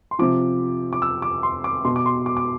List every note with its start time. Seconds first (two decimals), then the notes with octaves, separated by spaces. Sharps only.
0.11 C6
0.19 C3 F3 D6
0.93 D6
1.02 E6
1.22 D6
1.43 C6
1.64 D6
1.85 B2 C6
1.96 D6
2.06 C6
2.26 D6
2.37 D6